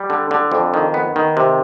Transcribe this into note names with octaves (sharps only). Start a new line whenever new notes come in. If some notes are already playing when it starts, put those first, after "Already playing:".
Already playing: G3
D3
D3
F2
D#3
B3
D#3
C3